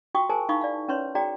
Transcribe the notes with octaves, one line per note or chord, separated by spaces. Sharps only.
F4 F#4 G5 C#6 D#6
G#4 A#4 C5 G#5 A5
D#4 E4 F5 B5 C#6 D#6
D5 F5
C#4 B4 C#5 C6
F#4 G#4 D5 G5 A#5